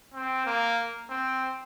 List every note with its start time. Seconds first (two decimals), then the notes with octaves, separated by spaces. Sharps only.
0.14 C4
0.46 A#3
1.10 C4